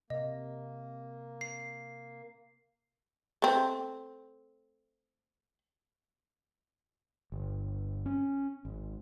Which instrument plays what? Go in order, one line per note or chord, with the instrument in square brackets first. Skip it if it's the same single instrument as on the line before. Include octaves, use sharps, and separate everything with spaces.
[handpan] C3 [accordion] A#3 [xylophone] D#5
[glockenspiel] C7
[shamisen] A3 C4
[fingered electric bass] G1
C#4
G#1